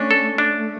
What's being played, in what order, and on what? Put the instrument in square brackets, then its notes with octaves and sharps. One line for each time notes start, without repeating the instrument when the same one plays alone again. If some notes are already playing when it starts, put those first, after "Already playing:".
Already playing: [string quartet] A3 C#4 [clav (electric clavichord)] D4
[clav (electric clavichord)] A4
[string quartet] A3 [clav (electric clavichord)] D4